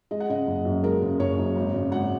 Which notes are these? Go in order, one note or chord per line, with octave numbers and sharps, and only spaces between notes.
G#3 D#5
F#5
C#3 D#5
F#1
F#2
G#3 A#4
C#3
F#1 C#5
F#2
G#1
C#3
G#1 F#5